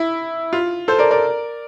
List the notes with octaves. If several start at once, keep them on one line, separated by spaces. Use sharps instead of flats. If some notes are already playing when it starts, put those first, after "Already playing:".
Already playing: E4
F4
A4 C5
A#4 D5
A#4 D5